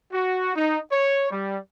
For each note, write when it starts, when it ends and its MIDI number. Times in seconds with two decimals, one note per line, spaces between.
0.12 0.52 66
0.56 0.79 63
0.92 1.27 73
1.31 1.58 55